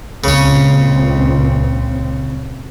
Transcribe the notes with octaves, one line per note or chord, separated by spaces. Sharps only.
C#2 A#2 C#3 C4 C#4